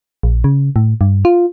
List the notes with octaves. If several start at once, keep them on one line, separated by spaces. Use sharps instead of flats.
A#1
C#3
A2
G2
F4